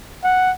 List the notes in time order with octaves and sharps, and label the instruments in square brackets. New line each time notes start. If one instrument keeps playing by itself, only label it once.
[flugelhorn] F#5